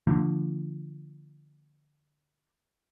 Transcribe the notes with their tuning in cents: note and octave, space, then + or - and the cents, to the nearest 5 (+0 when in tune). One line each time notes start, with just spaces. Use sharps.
D3 +0 F3 -25 A#3 -45